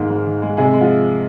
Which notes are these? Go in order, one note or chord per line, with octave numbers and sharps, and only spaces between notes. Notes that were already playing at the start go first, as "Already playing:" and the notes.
Already playing: G#2 D#3 G#3 A#3
G#2
D#3
G#3
C3 G#3 G#4
G#3
F3 F4